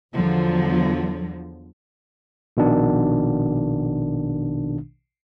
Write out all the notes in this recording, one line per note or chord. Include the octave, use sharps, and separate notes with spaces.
E2 D3 F3 F#3
A#1 B2 D#3 D4